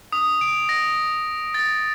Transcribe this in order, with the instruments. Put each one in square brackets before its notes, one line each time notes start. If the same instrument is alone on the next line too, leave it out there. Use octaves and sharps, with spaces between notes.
[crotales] D#6
D7
A#6
A6